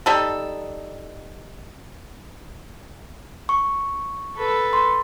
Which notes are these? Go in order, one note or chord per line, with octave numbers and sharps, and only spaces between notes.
G3 D#4 A4
C#6
A4 B4
C6